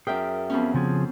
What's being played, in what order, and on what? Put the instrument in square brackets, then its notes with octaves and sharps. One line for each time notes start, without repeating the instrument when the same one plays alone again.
[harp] F#2 G5 [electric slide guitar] G#4 A#4 E5
[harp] F2 B3 C#4
[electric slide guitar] C#3 F3 G#4